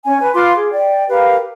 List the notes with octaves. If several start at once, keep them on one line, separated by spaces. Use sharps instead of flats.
C#4 G#5
B4 G#5
F4 B4 C6 D6
G#4
D5 G5
G4 A#4 B4 F5